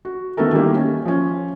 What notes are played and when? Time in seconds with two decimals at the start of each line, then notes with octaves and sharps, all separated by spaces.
0.05 F#4
0.37 D#3 A3 B3 F#4 A4 A#4
0.53 D#3 G3 A#3 E4
0.76 C#4
1.05 F3 C#4